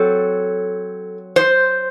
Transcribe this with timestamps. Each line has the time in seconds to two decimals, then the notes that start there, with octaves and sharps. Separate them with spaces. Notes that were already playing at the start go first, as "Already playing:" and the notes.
Already playing: F#3 C4 A4
1.36 C5